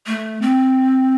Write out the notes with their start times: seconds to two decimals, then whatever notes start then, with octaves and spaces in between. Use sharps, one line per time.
0.07 A3
0.42 C4